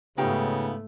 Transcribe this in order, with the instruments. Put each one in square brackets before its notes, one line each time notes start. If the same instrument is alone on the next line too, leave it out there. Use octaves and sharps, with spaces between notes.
[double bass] G#2 A3 [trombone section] C#3 [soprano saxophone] B3 [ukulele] D#4 F4 G4